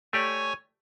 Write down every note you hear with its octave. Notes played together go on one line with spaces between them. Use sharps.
A3 G4 C#5 D5 G#5 C#6